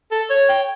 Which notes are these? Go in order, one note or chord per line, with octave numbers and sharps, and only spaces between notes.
A4
C#5
G5